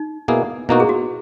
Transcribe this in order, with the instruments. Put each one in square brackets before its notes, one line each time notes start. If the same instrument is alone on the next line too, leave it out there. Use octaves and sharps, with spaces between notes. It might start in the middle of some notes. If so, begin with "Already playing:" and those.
Already playing: [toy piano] D#4
[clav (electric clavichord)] B2 A#3 E4 G#4
[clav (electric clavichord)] B2 A#3 D#4 F#4 [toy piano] E4
[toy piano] G#4
F#4